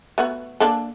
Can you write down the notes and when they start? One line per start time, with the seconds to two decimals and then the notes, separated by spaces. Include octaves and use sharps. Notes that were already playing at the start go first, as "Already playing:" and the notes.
0.18 A3 B3 F#4
0.60 A#3 D4 A4